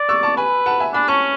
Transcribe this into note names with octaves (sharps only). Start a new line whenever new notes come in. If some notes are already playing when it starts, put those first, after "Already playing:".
Already playing: D5
C#6 E6
A5 C#6
B4 G#5 B5
F#5 A5
E5 G#5
D4 G#5 B5
C#4 A5 C#6